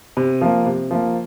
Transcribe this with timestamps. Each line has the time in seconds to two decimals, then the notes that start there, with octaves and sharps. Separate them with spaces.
0.17 C3
0.41 F3 A#3
0.66 C3
0.91 F3 A#3